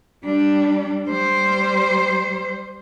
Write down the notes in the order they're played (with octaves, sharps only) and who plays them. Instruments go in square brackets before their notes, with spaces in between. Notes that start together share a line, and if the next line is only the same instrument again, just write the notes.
[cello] G3 D4
G3 C5